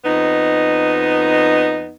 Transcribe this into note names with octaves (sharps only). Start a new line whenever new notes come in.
F2 B3 D#4